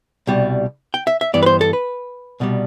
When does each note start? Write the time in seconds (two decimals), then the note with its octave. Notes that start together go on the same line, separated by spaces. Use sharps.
0.27 C2 B2 G3
0.94 G5
1.07 E5
1.21 E5
1.34 G2 E3 B3 D5
1.43 B4
1.46 C5
1.61 A4
1.73 B4
2.40 C2 B2 G3